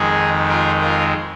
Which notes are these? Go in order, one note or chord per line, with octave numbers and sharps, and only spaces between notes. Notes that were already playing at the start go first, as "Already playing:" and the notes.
Already playing: F2 D#3 G#3 D#4 G#4
F4 A#4
F4 A#4